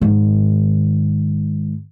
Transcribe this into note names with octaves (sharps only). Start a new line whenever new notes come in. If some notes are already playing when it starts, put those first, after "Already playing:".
G#2 D#3